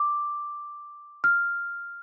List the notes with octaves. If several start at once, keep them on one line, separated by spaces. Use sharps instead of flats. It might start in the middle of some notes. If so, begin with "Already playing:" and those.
Already playing: D6
F6